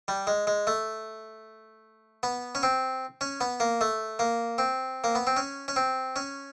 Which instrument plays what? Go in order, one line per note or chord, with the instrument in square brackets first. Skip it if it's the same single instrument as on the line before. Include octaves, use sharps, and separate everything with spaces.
[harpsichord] G3
G#3
G#3
A3
B3
C#4
C4
C#4
B3
A#3
A3
A#3
C4
A#3
B3
C4
C#4
C#4
C4
C#4